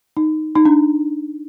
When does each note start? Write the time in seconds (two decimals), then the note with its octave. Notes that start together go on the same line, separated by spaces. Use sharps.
0.17 D#4
0.55 D#4
0.65 D4